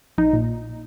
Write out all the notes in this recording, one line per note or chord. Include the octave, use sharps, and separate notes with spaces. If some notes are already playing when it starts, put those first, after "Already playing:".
A#1 D#4
A#2